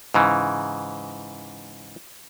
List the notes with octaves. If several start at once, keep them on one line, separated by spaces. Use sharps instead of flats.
G#2 C#3 E3